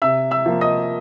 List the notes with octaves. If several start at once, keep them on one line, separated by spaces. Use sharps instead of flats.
C3 E5 E6
E5 E6
F3 A#3
D#5 D#6